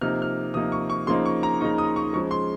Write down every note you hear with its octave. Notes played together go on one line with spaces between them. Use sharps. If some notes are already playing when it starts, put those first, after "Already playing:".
C3 F3 A#3 D#4 F6
F6
C3 F3 A#3 D#4 D#6
C#6
C#6
C#3 F3 A#3 D#4 C6
C#6
A#5
C#3 F3 A#3 D#4 C#6
D#6
C#6
C#3 F3 G#3 C#6
C6